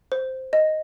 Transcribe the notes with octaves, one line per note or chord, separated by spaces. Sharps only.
C5
D#5